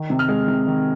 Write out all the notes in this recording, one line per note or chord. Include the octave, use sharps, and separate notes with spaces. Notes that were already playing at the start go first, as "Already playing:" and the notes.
Already playing: D#3
C3
F6
G#3
C3
D#3